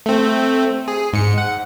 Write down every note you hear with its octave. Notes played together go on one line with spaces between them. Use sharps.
A3 C4
G#4
G#2 C#7
F#5